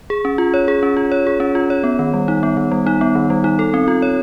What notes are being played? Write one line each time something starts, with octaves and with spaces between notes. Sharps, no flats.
G#4
C#4
F4
C#5
G#4
C#4
F4
C#5
G#4
C#4
F4
C#5
B3
D#3
G3
D#4
B3
D#3
G3
D#4
B3
D#3
G3
D#4
A4
C4
F4
C#5